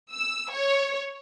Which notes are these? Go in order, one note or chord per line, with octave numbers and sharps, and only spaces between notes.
E6
C#5